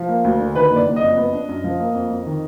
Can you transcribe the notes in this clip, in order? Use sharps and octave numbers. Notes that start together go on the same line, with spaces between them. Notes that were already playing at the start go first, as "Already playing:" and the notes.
Already playing: F3
A#3
D2
D3
D#3 B4
F#1
D5
F#1
D#5
F2
B3
D4
F#2
F3
A#3
F2
F2
D#3